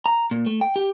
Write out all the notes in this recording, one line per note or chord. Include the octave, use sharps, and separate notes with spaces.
A#5
A#2
A3
G5
G4